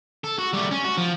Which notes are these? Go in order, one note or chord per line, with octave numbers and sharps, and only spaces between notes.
A4
F#4
G3 A3
C#4
F#4
F3